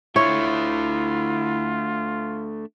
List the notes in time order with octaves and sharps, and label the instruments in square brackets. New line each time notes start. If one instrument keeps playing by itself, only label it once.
[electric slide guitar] A3 D4 E5 [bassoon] E4 [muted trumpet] F4 [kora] C#5